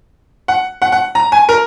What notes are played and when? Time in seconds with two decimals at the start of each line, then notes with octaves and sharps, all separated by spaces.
0.48 F#5
0.82 F#5
0.92 F#5
1.15 A#5
1.32 G#5
1.49 A#4